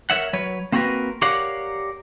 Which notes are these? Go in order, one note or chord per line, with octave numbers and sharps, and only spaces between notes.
A#4 C#5 E5 F#5
F#3 B4 C#5
A#3 C4 F#4 G#4 A#4 B4
G4 A#4 C#5 D5 F5 F#5